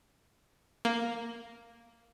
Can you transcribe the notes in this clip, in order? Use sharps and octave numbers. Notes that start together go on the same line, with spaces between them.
A#3